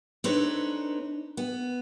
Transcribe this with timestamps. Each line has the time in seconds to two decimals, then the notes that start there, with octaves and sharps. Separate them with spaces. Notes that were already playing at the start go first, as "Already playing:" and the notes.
0.24 C4 D4 D#4 A4 B4 C#5
1.37 B3